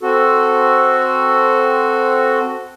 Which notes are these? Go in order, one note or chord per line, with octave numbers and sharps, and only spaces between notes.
C4 F#4 A4